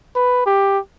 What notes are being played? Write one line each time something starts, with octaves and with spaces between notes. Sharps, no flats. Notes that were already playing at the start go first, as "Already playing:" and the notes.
B4
G4